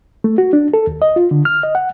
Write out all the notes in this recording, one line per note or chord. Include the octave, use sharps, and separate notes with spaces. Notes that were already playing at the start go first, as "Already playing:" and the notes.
A3
F#4
D4
A4
D#2
D#5
F4
D3
F6
D#5
F#5